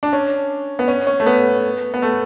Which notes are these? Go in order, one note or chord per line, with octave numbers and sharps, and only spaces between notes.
D4
C#4
B3
C#4
C#4
A3
B3
B3
A3